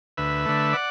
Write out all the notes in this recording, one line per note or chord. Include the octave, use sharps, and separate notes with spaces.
D2 B4 E5
D3 A3
D5 F#5